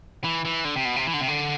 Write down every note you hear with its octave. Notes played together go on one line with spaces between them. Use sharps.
E3
E3
D3
C3
B2
C3
E3
D3
C3
D3